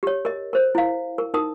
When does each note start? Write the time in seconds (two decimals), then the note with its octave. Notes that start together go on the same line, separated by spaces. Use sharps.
0.03 G4 C#5
0.25 A#4 D#5
0.53 A#4 C5
0.75 E4 F5
1.18 A#4
1.34 D#4 A#4 D#6